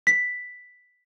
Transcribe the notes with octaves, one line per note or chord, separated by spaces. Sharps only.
B6